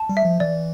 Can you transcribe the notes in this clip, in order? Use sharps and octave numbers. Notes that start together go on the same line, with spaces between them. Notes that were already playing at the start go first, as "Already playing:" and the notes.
Already playing: A5
G3
E5
F3
E3 D5